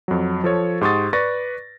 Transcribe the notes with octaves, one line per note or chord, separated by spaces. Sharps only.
F2 F#3
F3 A4 C#5
G#2 G4 C6 C#6 D#6 A6
B4 D5 C#6 A6 A#6